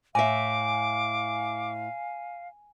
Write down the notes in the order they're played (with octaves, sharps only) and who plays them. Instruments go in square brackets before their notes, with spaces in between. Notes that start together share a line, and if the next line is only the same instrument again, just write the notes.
[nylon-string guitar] A2 E5 [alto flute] F5 [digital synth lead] G#5 [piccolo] D6